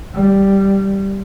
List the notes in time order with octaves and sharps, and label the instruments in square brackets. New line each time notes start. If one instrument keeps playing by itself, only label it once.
[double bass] G3